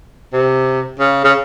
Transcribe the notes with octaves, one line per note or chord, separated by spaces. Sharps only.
C3
C#3
C#3